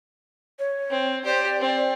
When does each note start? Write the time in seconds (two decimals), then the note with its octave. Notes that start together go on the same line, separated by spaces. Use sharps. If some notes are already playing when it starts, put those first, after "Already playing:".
0.59 C#5
0.91 C4
1.25 G4 C5 D5
1.59 C4